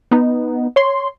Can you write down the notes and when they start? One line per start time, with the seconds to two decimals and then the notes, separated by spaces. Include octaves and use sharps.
0.11 B3 D#4
0.76 C#5 C6